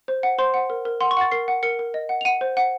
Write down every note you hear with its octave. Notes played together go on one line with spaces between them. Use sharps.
C5
F#5
C5 C6
F#5
A#4
A#4
F#5 C6
C#6
F#5 A6
A#4 C7
F#5
A#4 C#7
A#4
D#5
F#5
F7
F#5 D#7
C5
F#5